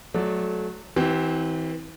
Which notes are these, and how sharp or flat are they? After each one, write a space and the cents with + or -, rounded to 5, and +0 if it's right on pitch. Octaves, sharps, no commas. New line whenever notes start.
F#3 -10 A3 -25 D5 +0
E3 -35 C4 +0 G4 -35